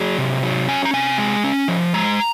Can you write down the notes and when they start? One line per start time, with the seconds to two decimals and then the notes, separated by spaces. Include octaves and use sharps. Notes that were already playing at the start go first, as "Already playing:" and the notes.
Already playing: F#3 G#4
0.18 C3
0.43 F#3
0.68 C#4 G#5
0.85 A#5
0.94 C3 G#5
1.18 G#3
1.44 C#4
1.68 F3
1.93 G#3 A#5